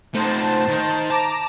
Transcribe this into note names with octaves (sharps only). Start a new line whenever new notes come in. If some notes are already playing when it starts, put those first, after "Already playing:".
A3 D#4 C5 A5
D#3
A5 A#5 D6